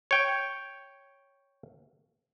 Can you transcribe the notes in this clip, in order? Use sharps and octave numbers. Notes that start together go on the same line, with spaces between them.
C#5 G5